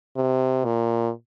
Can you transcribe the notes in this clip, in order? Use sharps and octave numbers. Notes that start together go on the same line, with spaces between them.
C3
A#2